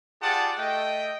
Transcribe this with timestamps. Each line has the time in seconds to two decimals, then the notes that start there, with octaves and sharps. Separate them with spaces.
0.22 F4 G4 G#4 D5 F#5 A5
0.57 A3 D#5 G5